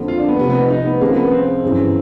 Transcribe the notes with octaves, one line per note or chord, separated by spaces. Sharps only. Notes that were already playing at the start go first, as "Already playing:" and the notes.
Already playing: F2 D3 F3 A#3
F4
D4
B3
C2 C3 F3 B3
B3
D#4
D#4
B3
C#2 C3 F3 G#3 A#3 C4
B3
C4
G1 F#2 C#3 E3